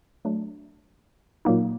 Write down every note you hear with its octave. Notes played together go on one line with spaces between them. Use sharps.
F#3 A3 D4
A#2 F#3 A#3 D#4